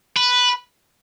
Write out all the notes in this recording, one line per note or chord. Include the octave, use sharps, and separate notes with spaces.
B4